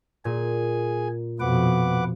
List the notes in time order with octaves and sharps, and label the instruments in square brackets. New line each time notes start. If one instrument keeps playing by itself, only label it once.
[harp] A#2 [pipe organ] G#4 G#5
[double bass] F2 B2 [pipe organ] B4 F#5 D6